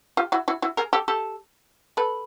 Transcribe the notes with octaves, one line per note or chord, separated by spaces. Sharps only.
F4 G4
E4 F#4
E4 F#4
E4 F#4
G#4 A#4
G4 A4
G4 A4
A4 B4